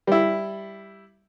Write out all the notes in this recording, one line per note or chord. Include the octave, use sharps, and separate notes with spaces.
G3 E4